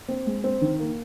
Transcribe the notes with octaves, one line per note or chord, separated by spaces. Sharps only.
C4
G#3
C4
D#3
A#3